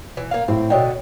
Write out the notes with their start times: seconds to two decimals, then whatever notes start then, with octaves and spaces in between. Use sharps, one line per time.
0.17 E3
0.31 A#3 F5
0.48 A2 C4
0.70 B2 D3 C#5 D#5 G5